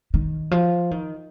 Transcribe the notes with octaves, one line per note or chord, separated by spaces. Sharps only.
D#3
F3
D#3